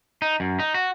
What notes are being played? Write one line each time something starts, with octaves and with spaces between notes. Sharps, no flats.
D#4
F#2
D#4
F#4